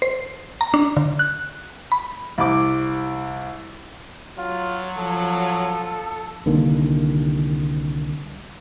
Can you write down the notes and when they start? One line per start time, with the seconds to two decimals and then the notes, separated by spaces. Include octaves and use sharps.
0.02 C5
0.61 A#5
0.74 D4
0.97 D3
1.19 F#6
1.92 B5
2.38 C2 D6
4.38 F#3 F4
4.98 F3 A4
6.46 C2 D3 D#3 A#3